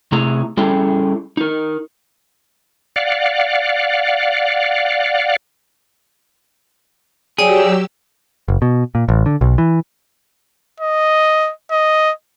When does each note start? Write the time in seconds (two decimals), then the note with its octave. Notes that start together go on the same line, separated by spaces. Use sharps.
0.12 C3 A3 E4 G#4 A#5
0.57 G3 C#4 E4 G#4 A4 G5
1.37 D#4 A#4
2.96 D5 F5 F#5
7.39 F#3 G4 G#4 C#5 D5 G5 E6
8.48 F#1
8.62 B2
8.95 A#2
9.09 A1
9.26 D3
9.41 B1
9.58 E3
10.81 D#5
11.72 D#5